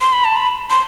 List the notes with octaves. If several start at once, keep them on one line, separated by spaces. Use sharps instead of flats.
C6
B5
A5
B5
C6